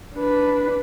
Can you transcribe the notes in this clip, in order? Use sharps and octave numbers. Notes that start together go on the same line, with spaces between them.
D4 B4